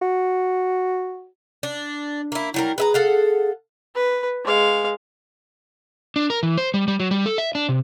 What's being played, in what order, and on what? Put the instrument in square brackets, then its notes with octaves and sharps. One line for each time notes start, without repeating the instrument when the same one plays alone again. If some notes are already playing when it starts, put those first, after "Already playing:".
[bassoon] F#4
[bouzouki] D4
A#3 E4
[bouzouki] F#3 G3 A#4 [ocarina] E4
[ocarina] G#4 [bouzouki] B4 E5 A#5
[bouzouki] A4 F5 F#5
[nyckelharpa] B4
G#3 F5
[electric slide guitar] D4
A#4
E3
C5
G3
G3
F#3
G3
A4
E5
D4
C3